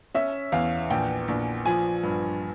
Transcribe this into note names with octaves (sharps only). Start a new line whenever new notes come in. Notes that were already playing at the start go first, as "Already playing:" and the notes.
C#4 E5
E2 F5
A#1 G5
A#1
F3 G#5
G2